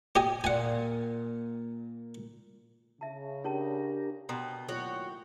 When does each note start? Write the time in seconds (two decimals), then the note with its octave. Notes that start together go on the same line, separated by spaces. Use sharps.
0.16 G4 D#5 G#5
0.44 A#2 A#3 F#5 G#5
3.01 C#3 E5 A5
3.44 C#4 D4 G4 A#4 C#5 A5
4.29 B2 A4 G5 A#5 C6
4.69 D#2 A2 F#3 F4 F#4 A4 C#5